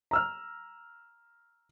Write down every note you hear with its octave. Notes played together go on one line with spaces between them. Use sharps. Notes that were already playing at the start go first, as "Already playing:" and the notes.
A#5 E6 F6